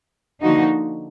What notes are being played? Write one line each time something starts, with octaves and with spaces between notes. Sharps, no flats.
D3 F3 A#3 D#4 F#4